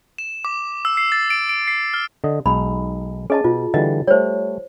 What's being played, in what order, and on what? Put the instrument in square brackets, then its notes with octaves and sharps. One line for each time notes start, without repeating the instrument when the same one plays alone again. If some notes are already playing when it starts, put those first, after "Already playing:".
[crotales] E7
D6
E6
C7
A6
D7
D7
C7
F6
[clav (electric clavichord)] D3 D#5
[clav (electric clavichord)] B1 G#3 D#4 [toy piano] B5
[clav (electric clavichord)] C#4 [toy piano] G#4 D#5 A5
[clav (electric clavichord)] B2 [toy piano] F4
[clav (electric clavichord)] D3 E3 G3 [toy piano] D#5
[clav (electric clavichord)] G3 A3 [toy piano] C5 C#5